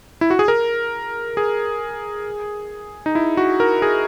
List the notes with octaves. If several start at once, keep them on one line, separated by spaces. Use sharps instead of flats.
E4
F#4
G#4
A#4
G#4
D#4
E4
F#4
A#4
G#4